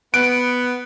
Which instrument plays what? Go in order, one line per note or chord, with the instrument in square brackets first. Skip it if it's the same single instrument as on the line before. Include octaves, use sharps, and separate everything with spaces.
[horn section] B3 [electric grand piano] F#6 D7